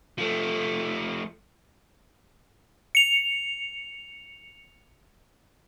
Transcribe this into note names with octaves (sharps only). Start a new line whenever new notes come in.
F3 A3
C#7 F7